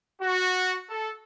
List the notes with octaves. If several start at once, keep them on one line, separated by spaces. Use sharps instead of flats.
F#4
A4